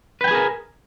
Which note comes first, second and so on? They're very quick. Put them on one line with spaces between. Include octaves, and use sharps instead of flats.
B4 G5 G#5 G#4 A#4